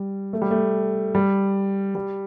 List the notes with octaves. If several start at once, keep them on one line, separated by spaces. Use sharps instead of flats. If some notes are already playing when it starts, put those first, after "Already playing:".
Already playing: G3
A3
G3
A3
G3
G3